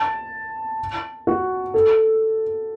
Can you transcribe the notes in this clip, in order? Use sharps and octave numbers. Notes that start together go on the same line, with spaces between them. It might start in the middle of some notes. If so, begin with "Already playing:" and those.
Already playing: A5
F#4
A4